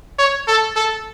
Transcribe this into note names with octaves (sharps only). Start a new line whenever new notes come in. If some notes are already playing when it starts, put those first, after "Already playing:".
C#5
A4
A4